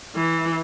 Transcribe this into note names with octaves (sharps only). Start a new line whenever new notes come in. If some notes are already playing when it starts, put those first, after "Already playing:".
E3